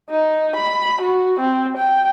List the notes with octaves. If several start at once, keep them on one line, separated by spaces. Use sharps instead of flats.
D#4
B5
F#4
C4
G5